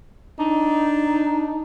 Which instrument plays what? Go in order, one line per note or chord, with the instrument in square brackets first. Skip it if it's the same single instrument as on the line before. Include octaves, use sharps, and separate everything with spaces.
[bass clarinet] D4 [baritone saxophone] D#4